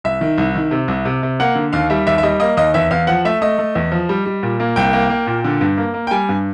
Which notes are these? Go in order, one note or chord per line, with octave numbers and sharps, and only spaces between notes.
C2 E5
D#3
C2
D#3
C3
C2
C3
C3
A#3 F#5
D3
D#2 F5
G3 E5
D#2 E5
E5
G3 D#5
A#3 D#5
D#2 D#5
E2 E5
E2 F5
F3 F#5
A3 E5
A3 D#5
A3
E2
F3
G3
G3
A#2
A#3
C2 G5
A#3
A#3
A#2
D3
G2
A#3
A#3
G5
G3 G#5
G2